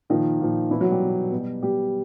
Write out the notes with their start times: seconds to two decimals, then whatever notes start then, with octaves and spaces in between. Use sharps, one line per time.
0.10 A#2 D#3 F3 D#4
0.41 A#2 F3
0.71 B2 E3 E4
0.81 F#3 F#4
0.92 G3 G4
1.02 B2
1.32 B2
1.62 B2 G3 G4